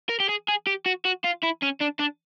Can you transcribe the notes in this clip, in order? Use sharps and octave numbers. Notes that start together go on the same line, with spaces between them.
A#4
G4
G#4
G#4
G4
F#4
F#4
F4
E4
C#4
D4
D4